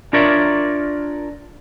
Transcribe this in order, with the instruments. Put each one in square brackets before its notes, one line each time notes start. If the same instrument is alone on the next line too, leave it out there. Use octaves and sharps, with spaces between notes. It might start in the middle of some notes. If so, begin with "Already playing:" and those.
[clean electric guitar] D4 F4 A#4 C#5 D5 E5